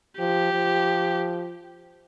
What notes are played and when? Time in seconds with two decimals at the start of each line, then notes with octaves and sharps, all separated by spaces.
0.19 F3 G4
0.53 F3